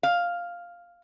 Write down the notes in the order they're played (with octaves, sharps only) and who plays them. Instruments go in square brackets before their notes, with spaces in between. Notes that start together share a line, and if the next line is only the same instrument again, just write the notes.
[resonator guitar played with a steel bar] F5